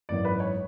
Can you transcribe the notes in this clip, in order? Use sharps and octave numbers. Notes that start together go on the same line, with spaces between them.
G#1 F#2 E3 B3 D5
B4
C#5